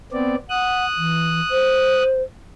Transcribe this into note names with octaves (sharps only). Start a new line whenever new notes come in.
B3 C4 D5
F#5 D#6 F#6
E3
C5